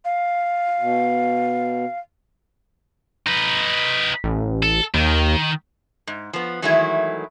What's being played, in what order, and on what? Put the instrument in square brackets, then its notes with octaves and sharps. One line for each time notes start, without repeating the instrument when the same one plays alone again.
[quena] F5
[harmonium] B2
[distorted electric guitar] D#4 B4
[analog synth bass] A1
[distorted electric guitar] A4
[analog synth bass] D#2 [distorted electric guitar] D#3
[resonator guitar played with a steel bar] G#2
F3 B3
D#3 E3 F#3 G#3 A3 E4